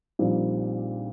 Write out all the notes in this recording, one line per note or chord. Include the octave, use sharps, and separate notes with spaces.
A#1 A#2 G3 C4 D#4